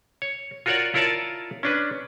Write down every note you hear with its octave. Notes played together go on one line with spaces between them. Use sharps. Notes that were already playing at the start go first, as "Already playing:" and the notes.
C#5
F4 F#4 A#4 C#5 D5 F#5
E4 F4 A#4 C#5 D5 A5
C#4 D4 B4